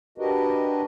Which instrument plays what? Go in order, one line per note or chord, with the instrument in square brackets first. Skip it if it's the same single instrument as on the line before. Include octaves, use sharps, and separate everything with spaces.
[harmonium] D4 F#4 G4 A#4 B4 D#5